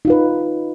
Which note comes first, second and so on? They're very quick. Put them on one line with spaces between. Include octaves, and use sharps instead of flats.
D#4 F4 B4